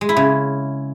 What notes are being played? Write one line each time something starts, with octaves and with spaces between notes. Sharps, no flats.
G#3
E4
C#3